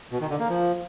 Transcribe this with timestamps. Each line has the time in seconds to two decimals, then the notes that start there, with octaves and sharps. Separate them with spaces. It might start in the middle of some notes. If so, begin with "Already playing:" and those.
0.11 B2
0.21 D#3
0.30 D3
0.40 A#3
0.49 F3